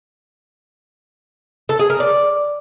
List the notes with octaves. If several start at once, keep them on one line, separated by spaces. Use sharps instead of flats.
A4
G#4
A#4
D5